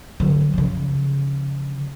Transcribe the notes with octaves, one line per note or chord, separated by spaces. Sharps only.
D3 F#3
C#3 F3